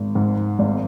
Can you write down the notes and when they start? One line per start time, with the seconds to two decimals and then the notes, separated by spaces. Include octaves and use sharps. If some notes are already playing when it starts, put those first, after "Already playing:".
Already playing: G#1
0.15 G#2
0.59 G#1